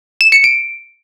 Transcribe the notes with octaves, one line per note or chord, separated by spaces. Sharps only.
E7
C#7
D7